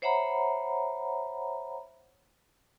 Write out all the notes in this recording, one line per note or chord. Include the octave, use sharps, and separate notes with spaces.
C5 C#5 E5 F#5 A#5 B5